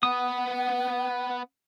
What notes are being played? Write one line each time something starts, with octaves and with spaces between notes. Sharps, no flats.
B3 B4 F#5 D#6